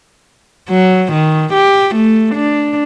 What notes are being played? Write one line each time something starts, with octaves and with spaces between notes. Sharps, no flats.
F#3
D#3
G4
A3
D4